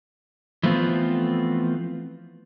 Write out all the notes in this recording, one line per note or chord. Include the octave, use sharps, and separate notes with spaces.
E3 F3 A3 B3 C4 F4